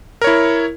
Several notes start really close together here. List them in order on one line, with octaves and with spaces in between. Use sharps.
A#4 C#5 E4